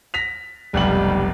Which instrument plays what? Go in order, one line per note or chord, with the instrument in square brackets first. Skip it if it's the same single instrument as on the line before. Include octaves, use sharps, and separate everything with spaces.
[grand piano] A#6 B6 F7
[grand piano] F1 B1 F#7 [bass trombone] G3